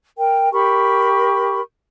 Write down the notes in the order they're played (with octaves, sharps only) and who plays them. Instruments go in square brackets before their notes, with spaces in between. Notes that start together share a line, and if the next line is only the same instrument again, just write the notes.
[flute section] A#4 G5
G4 A#4 B5 C#6